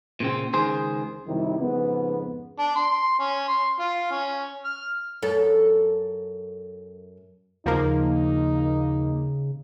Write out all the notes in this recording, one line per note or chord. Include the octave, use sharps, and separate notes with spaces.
A#2 C#3 C4
C#2 D#3 G#4 C5
F#2 C3 D#3 G3 D#4 E4
F2 G#2 C#3 B3
D4
C6
C#4
C6
F4
C#4
F6
F#2 A4
D#2 C#3 F3 A#3 D#4